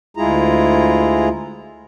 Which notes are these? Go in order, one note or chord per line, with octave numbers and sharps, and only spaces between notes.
D2 G#3 E4 F4 G#4 A#5